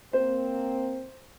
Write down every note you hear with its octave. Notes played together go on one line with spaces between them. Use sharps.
A#3 C4 C5